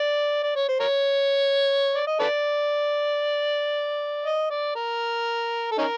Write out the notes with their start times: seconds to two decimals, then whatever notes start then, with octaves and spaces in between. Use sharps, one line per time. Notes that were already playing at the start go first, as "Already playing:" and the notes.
Already playing: D5
0.43 D5
0.55 C#5
0.68 C5
0.80 A#4 C#5
1.95 D5
2.07 D#5
2.20 A4 B4 D5
4.25 D#5
4.50 D5
4.75 A#4
5.71 A4
5.78 C#4 D#4 A#4